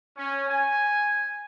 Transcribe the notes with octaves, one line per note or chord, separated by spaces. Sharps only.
C#4
G#5